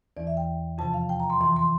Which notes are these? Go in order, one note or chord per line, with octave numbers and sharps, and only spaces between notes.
E2 E3 D5
E5
G5
F2 C3 F3 A5
F5
G5
A#5
C6
F2 E3 C6
C6